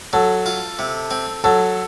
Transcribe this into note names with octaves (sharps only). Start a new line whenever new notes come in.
F#3 A4
F4
C3
C4
F#3 A4